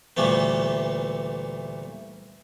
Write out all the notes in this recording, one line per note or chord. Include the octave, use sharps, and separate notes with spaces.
D2 A#2 E3 G3 A3 B3